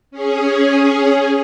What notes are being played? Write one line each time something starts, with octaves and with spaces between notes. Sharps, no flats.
C#4 G#4